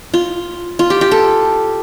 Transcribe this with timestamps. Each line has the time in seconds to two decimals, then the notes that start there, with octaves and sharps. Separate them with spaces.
0.14 F4
0.79 F4
0.90 G4
1.01 G4
1.11 A4